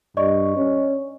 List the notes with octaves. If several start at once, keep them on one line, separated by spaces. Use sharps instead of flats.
G2 D5 D#5 C#6
C#4